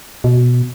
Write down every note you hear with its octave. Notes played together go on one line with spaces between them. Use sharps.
B2